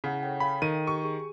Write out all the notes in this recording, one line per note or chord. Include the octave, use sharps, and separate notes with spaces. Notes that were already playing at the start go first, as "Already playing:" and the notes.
C#3 E4 F#5
A4 C#5 G5
F5 G5 B5 B6
D#3 A4 D#7
G4 C#6
G#4